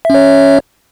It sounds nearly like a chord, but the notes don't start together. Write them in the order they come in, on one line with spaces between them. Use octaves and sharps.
E5 C#4 C#5